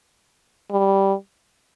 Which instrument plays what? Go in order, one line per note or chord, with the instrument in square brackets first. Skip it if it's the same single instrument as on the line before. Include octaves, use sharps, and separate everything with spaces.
[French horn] G3